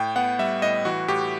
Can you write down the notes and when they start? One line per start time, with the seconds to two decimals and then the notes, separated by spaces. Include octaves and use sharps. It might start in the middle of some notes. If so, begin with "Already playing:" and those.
Already playing: A2 G5
0.16 B3 F#5
0.39 G3 E5
0.62 A2 D#5
0.85 E3 F#4
1.08 A2 G4